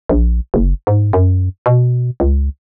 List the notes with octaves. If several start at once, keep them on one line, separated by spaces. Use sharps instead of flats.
A#1
F#1
G#2
F#2
B2
C#2